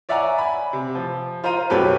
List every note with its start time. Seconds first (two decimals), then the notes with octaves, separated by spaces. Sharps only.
0.09 C#5 D5 E5 F#5 G#5 A#5
0.38 G#5 B5
0.73 C3
0.95 F3
1.44 F4 C5 F5 A#5 D#7
1.70 B1 F#3 C#4 G4 A4 B4